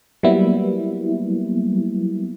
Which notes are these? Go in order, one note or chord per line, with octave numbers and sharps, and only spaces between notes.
F#3 G3 A#3 B3 E4